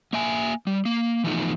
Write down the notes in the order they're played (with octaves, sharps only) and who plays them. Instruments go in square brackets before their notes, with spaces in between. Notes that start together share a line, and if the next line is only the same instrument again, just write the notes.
[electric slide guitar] A#3 E5 G#5
G3
A#3
E3 F3 A3 B3 D#4